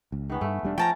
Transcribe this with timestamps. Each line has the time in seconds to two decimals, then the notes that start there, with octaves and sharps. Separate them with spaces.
0.12 C#2
0.30 D#3 B3 C#4
0.41 G2 A3
0.63 E1 G3 D4
0.78 F3 C#4 G5 A5 A#5